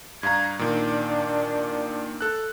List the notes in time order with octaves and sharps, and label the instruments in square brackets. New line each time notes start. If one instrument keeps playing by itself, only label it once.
[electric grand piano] G2 F5 A#5 [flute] G#6
[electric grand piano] A#2 D#3 [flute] D4
[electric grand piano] A4 F#6